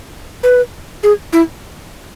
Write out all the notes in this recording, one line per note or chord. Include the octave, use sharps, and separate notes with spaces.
B4
G#4
E4